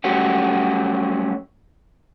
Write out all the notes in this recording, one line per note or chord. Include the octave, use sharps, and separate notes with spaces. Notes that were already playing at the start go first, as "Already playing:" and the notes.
F#3 G3 A3 C#4 F#4 G4